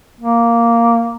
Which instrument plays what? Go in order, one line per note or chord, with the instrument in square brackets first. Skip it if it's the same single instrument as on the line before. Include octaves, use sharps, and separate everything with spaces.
[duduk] A#3